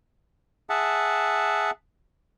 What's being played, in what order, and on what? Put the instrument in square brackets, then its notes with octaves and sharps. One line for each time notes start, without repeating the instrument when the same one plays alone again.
[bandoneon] G#4 E5 F#5 A5